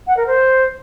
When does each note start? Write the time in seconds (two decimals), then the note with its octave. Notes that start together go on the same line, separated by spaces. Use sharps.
0.07 F#5
0.17 A#4
0.27 C5